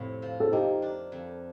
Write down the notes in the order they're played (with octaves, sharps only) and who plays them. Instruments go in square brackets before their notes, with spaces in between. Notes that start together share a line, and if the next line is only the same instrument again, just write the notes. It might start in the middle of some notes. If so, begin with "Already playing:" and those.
Already playing: [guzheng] F2 A2 C3
F3
[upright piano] A4
[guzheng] A#3 [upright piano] D#4 G4
[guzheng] D4
F2